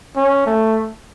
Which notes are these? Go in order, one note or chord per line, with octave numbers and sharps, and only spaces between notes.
C#4
A3